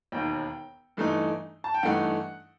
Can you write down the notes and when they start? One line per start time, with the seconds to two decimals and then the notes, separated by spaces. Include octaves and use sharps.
0.12 E1 D#2 D#3 G5
0.97 G2 E3 A3 D#4
1.64 A5
1.74 G5
1.83 G2 E3 A3 D#4 F#5